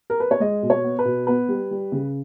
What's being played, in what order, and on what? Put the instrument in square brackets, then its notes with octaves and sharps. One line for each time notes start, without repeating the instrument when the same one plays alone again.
[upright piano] A#4
B4
C#5
G#3 D#5
B2
C#5
B3
B4
B2
B3 B4
G3
G3
C#3